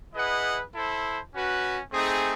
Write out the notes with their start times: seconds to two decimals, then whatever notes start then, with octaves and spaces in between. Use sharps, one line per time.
0.14 E4 G#4 B4 D#5 F#5
0.72 E4 A4 C5
1.33 C#4 F#4 B4
1.92 A3 C4 D#4 G#4